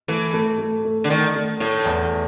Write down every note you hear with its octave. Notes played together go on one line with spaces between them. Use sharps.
E3 A3
A3
A3
A3
D3
D#3 A3
A3
A2 A3
E2